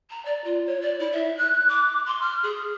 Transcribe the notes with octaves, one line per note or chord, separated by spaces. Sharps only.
A#5
D5
F4
C#5
D5
E4
E5
F#6
D6
C6
F6
G#4